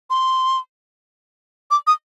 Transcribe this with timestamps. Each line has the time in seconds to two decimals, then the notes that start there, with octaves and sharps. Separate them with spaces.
0.10 C6
1.71 D6
1.87 D#6